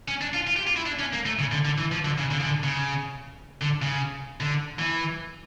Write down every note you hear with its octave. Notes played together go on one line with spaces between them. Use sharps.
C#4
D4
F4
F4
G4
F4
E4
D4
C#4
A#3
A3
C#3
D3
D3
E3
F3
D3
C#3
D3
C#3
D3
C#3
D3
C#3
D3
E3